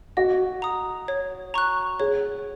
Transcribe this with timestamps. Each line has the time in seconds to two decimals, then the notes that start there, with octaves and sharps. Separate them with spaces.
0.17 F#4 D#5
0.62 A#5 D#6
1.08 C#5
1.54 A#5 C#6 F#6
2.00 G#4 C#5